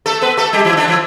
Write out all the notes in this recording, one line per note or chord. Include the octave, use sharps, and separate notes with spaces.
A3 A4
B3 B4
A3 A4
G3 G4
E3 E4
D3 D4
E3 E4